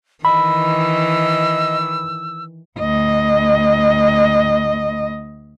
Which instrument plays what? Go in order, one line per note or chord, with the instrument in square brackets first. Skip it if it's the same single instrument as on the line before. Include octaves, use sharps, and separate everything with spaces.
[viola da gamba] D#3 E3 [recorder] D#5 [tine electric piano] B5 [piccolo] E6
[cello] D2 D#5